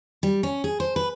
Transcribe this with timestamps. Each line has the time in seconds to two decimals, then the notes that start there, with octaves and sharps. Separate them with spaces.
0.23 G3
0.43 C#4
0.64 G#4
0.80 C5
0.96 B4